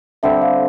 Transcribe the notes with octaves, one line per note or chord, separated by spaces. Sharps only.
D3 G3 C4 E5
F5